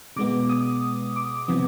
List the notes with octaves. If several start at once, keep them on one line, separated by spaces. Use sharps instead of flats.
B2 G#3 B3 D6
D#6
D6
C3 F3 B3